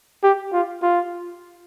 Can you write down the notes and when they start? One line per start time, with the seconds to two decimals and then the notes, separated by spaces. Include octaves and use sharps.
0.23 G4
0.53 F4
0.82 F4